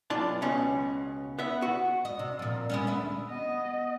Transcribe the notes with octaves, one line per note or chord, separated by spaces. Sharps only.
B1 D4 F4 A5
C#2 B2 C#4
B3 E5
F#4
D#5
C3
A#2 F3
G#3 B3 C#4
D2 B4 E5
B3 D#5